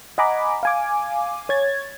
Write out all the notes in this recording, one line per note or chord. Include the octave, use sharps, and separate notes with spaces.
D#5 F#5 G#5 A#5 B5 D6
F5 G#5 D6
C#5 G#6 A6